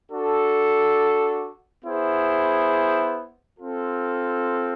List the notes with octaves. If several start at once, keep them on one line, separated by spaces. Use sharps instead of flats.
D4 F#4 A4
B3 E4 G#4 C5
C4 F4 A4